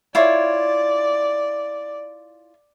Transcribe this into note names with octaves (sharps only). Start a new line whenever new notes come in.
E4 F4 C#5 D5